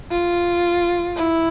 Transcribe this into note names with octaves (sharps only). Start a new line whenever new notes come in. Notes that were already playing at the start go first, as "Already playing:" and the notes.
F4
E4